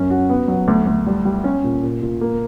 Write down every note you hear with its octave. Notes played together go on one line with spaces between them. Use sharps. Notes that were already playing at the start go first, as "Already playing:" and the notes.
Already playing: F#2 C#4
F#4
B3
F#3
D2
D2
G3
G3
C#4
A#2
A#2
A#2
A#3